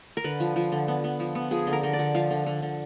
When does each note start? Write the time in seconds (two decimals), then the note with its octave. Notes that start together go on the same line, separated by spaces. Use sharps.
0.17 A#4
0.24 D3 B4
0.40 F3
0.56 F3
0.72 D3
0.88 B3
1.04 B3
1.20 F3
1.35 B3
1.51 F3 G#4
1.67 D3
1.73 A#4
1.83 D3
1.93 D5
1.99 D3
2.14 F3 F5
2.31 D3
2.46 D3
2.62 D3